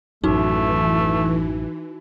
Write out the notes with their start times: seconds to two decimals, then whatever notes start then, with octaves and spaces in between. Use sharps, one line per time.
0.24 A1 F#2 E3 A3 D#4 F#4